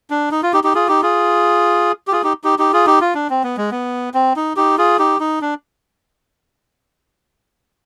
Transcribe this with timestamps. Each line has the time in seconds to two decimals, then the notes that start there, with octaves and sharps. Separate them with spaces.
0.10 D4
0.31 D#4
0.43 F4
0.53 D#4 G4
0.64 D#4 G4
0.74 F4 G#4
0.88 D#4 G4
1.02 F4 G#4
2.08 G4
2.12 F4 G#4
2.23 D#4 G4
2.44 D#4 G4
2.59 D#4 G4
2.73 F4 G#4
2.86 D#4 G4
3.01 F4
3.15 D4
3.30 C4
3.44 B3
3.57 G#3
3.71 B3
4.14 C4
4.36 D#4
4.56 D#4 G4
4.78 F4 G#4
4.99 D#4 G4
5.20 D#4
5.42 D4